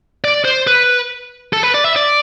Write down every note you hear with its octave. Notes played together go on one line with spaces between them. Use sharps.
D5
C5
B4
A4
B4
D5
E5
D5